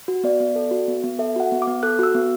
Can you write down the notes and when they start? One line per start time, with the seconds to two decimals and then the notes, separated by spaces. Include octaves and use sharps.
0.08 F#4
0.24 B3 D5
0.40 B3
0.56 A4
0.71 F#4
0.88 B3
1.04 B3
1.19 A4 E5
1.36 F#4 F#5
1.52 B3
1.62 D6
1.67 B3
1.83 A4 F#6
1.99 F#4 E6
2.15 B3